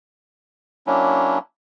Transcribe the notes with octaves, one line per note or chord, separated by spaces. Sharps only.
F#3 A#3 C#4 D4 E4